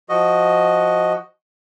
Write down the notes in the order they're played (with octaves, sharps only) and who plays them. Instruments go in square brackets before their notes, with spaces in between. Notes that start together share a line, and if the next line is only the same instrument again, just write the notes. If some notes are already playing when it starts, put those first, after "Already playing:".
[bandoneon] F3 F#4 D#5